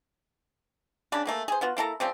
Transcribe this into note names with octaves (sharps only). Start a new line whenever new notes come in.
C#3 D4 B5
A3 A#3 G#4
G#4 C5
B3 F4 F#4
A#3 E4 A4 A#5
C#3 F3 G3 C4